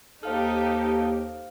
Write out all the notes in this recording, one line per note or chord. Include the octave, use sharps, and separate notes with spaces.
D#2 D#4 G4 A4 C5 F5 F6